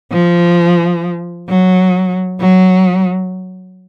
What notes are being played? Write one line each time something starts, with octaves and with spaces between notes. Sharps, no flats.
F3
F#3
F#3